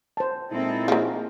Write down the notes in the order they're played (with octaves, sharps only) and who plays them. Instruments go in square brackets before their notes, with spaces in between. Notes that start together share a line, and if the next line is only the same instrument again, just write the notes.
[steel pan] C5 A5
[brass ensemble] A#2 D#4 E4 [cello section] G#3 C4 A4
[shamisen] D#3 F3 [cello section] A#3 [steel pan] G#4